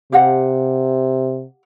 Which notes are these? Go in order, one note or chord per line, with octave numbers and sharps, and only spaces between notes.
C3 G4 F5 F#5